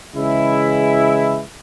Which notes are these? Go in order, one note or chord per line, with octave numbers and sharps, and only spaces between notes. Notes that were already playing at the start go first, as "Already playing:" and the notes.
C#3 E3 G#3 E4